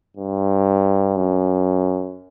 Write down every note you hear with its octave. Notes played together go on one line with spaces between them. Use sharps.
G2
F#2